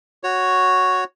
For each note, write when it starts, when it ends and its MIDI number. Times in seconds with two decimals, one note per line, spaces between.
0.24 1.04 66
0.24 1.04 73